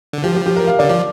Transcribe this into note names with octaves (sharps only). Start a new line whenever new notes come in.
D3
F3 G4
G4
G4
A#4
F5
D3 D5
F3 D5